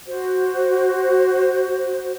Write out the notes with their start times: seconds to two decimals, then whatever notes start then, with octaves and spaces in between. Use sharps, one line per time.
0.07 F#4 C5